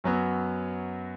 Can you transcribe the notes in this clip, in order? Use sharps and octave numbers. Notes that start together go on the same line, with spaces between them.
F#2 F#3 B3